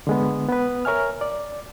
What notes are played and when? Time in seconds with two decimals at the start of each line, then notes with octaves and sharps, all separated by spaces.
0.07 D3 G#3 B3
0.49 B3 B4
0.85 A#4 C#5 E5 G#5 F6
1.21 D5